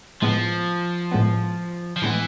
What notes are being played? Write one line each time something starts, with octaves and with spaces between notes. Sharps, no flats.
A2 F3 G#3 B3
A2 G#3 B3
F3
A2 E3 G#3 B3